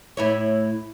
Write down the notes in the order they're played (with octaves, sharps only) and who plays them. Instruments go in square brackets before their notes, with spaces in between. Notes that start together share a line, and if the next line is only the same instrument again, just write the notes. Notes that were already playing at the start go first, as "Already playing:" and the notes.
[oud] A2 E4 C#5